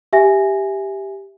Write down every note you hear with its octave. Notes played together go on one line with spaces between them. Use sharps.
G4 E5 G#5 A#6